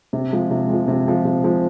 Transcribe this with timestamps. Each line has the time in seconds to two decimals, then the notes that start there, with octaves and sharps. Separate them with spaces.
0.13 C3
0.32 F3 G#3
0.51 C3
0.68 G#3
0.73 F3
0.88 C3
1.07 F3 G#3
1.25 C3
1.44 F3 G#3